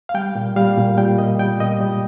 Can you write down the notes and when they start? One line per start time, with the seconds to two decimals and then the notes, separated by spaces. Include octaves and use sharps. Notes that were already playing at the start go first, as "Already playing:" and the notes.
0.09 F5
0.14 G3 G5
0.35 A#2
0.56 G3 F5
0.77 A#2
0.98 G3 G5
1.18 A#2 D#5
1.39 G3 G5
1.60 A#2 D#5
1.81 G3